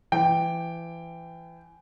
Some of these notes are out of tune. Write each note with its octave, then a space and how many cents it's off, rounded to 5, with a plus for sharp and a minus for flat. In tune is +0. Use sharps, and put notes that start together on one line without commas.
E3 +30 G5 +0